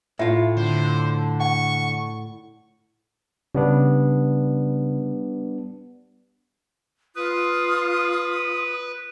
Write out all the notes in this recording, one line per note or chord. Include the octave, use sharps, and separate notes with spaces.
A2 F4 E5
D3 C5
F#5 C#6
C#3 G3 B3 D4
F4 B4 D#6